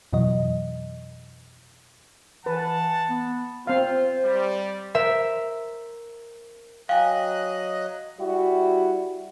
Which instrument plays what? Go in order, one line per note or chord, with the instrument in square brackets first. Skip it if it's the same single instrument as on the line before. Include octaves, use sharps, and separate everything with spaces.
[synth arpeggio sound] F2 B2 E3 F#3 D#5
[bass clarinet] E3 [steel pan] B4 [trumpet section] F#5 A5
[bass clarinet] B3
[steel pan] C4 F5 [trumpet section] F4 [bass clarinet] C5
[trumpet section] G3
[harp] A#4 C5 E5
[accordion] F#3 D#5 F#6 [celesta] F5 [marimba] G5 G#5
[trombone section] G3 E4 F#4